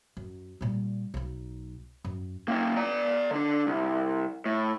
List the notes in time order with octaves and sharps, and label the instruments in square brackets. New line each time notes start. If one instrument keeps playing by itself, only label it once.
[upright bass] F#2
A#2 G3
B1 D#4
F#2
[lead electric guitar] A#3 C#4
D5 A#5
D3 D4
C2
A2